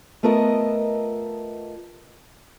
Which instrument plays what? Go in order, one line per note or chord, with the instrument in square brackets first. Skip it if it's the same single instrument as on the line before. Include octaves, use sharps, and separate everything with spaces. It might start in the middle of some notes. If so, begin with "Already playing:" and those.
[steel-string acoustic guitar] A3 B3 F4 A4 A#4 D#5